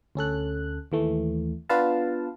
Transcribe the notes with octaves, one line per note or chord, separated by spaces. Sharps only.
D2 C#4 A4 F#6
D#2 E3 A3
B3 D4 F4 B4 F5 A5